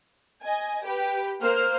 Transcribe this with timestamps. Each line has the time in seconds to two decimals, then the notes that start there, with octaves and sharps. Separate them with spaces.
0.43 D#5 G#5
0.85 G4 B4
1.42 A#3 C5 F6